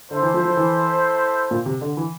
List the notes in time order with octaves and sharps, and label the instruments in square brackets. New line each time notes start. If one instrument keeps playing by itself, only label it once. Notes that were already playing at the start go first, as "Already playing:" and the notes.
[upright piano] D3 [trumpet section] E4 A4 C5
[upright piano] E3
F3
F3
E3
A#2
C3
D3
E3